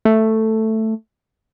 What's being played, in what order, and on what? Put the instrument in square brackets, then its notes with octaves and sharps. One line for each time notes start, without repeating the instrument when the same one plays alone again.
[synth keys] A3